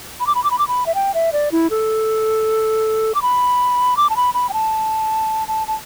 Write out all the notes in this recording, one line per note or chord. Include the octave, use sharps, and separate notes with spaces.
B5
D6
B5
D6
B5
D6
B5
E5
G5
E5
D5
E4
A4
D6
B5
D6
A5
B5
B5
G5
A5
A5
A5